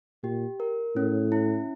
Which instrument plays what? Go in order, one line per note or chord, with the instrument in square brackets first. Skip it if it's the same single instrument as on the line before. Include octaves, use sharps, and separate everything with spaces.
[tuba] A#2 [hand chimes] G4
[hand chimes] A#4
[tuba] A2 [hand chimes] C#4
[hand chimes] E4